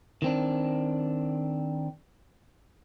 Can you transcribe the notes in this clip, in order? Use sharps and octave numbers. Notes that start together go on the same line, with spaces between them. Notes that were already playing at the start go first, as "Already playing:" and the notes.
D#3 C4 D4